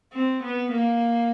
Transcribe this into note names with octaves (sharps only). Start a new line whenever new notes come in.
C4
B3
A#3